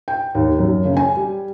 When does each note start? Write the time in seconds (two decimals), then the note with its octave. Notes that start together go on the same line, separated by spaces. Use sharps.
0.08 G5
0.35 D#2
0.59 F#2
0.85 C#3
0.97 G#5
1.17 G3